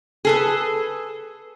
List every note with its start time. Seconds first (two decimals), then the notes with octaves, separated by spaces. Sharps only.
0.25 G#4 A4 B4